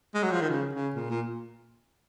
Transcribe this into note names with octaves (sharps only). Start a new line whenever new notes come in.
G#3
F#3
F3
D#3
C#3
C#3
A#2
A#2